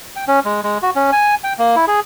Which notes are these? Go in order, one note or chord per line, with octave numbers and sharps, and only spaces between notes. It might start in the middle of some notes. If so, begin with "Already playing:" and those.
G5
C#4
G#3
G#3
F#4
C#4
G#5
G5
A#3
E4
G#4